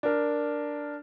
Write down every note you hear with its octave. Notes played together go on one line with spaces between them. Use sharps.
D4 A#4